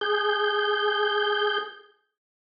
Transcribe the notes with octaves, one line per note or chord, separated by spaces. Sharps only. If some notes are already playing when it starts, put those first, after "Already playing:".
G#4 G6